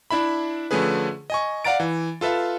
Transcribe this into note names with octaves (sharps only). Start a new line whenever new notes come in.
D4 E4 E5 B5
D3 F3 A3 C#4 G#4 B4
D#5 G#5 C#6
D5 F5 F#5 A#5 A6 D7
E3
F4 A4 B4 E5 F5